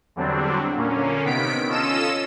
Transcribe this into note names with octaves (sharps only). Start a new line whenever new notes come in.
E2 D3 F#3 G3 C4 D4
A#2 D3 A#3 C#4
C3 D#3 B3 B6 D7
C#4 F4 A4 D#5 E6 E7